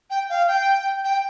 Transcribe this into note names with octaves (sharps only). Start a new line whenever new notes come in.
G5
F5
G5
G5